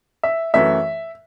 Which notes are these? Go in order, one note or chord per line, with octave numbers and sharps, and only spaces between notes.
E5
F#2 E3 A3 E5